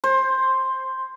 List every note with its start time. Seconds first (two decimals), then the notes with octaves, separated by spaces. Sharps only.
0.04 C5